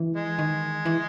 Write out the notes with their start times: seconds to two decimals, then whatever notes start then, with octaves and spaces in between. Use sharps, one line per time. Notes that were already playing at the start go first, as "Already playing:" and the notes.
Already playing: E3
0.16 G#3
0.39 D#3
0.85 E3